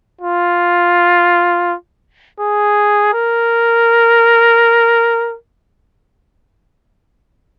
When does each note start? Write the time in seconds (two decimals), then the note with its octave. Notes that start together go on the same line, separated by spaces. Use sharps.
0.21 F4
2.39 G#4
3.13 A#4